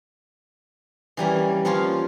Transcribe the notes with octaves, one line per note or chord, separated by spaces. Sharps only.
E3 G3 A#3 C#4
F3 A#3 C#4 F4